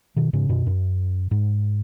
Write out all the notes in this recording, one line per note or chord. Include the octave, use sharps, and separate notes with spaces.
B2 D#3
G#2 C#3
F#2 B2
F#2
G#2